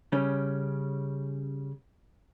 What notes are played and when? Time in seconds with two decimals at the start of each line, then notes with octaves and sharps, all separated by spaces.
0.12 C#3 G3 C#4